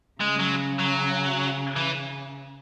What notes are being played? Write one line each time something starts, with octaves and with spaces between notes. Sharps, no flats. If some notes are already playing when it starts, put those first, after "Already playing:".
C#3 G#3
F#3
F#3
E3